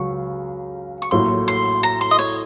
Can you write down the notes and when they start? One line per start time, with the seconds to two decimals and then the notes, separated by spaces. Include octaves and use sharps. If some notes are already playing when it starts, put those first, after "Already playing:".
Already playing: C#2 C#3 F#3 C#6
1.02 C#6
1.11 A1 A2 F#3 A#3 C6
1.48 C6
1.83 A#5
2.01 C6
2.11 D#5
2.19 C#5